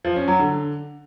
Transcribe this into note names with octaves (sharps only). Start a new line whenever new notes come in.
F3
C#4
F#3
D3